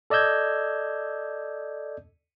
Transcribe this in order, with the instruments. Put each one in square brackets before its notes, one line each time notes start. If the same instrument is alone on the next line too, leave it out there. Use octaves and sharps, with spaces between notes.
[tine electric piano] A4 D5 D#5 E6 G6 G#6